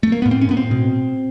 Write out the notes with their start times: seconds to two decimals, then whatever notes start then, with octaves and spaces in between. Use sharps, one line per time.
0.03 A3
0.12 A#3
0.22 A2 B3
0.31 C4
0.41 C#4
0.49 A2 B3
0.57 C4
0.71 B2